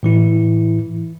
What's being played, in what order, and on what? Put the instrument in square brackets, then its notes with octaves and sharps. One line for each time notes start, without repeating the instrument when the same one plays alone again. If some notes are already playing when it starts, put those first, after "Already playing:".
[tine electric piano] A2 E3 E4